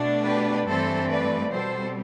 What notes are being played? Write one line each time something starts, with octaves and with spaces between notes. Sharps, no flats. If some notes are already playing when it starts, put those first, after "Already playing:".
Already playing: B2 A3 D4
G4 B4
G2 E3 A3 C4 A4 C5
B4 D5
B2 G3 C4 A4 C5